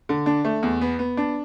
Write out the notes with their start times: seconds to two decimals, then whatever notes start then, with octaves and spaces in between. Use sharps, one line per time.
0.09 D3
0.26 D4
0.44 A3
0.63 E2
0.81 B3
0.99 B3
1.17 D4